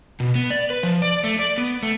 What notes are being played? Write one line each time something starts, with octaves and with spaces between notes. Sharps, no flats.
B2
B3
D5
B4
F3
D5
A3
D5
B3
A3